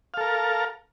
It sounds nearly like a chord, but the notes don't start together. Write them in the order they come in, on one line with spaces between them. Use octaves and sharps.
F5 A4 A#4